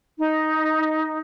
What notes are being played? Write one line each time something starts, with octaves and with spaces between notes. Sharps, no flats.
D#4